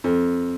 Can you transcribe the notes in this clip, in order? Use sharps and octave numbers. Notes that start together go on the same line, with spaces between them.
F2